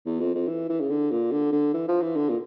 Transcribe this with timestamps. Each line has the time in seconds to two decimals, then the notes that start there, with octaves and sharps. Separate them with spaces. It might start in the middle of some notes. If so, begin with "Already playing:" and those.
0.06 E2
0.21 F2
0.35 F2
0.48 E3
0.70 E3
0.81 C#3
0.90 D3
1.11 A#2
1.32 D3
1.52 D3
1.74 E3
1.88 F3
2.02 E3
2.16 D3
2.29 A#2